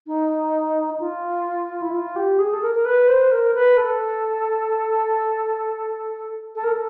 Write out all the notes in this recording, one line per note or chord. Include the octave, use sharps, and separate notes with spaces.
D#4
F4
E4
F4
G4
G#4
A4
A#4
A#4
B4
C5
A#4
B4
A4
A4
A#4
A4